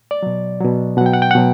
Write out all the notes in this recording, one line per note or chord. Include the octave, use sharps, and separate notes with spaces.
D5
B2 F#3
B2 F#3
B2 F#3 F#5 G5
F#5
G5
F#5
B2 F#3